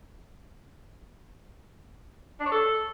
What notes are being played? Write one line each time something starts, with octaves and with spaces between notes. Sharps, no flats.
D4
C#5
A4